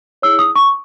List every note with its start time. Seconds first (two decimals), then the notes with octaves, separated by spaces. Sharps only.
0.22 E4 G#4 C#5 E6
0.39 D#6
0.56 C#6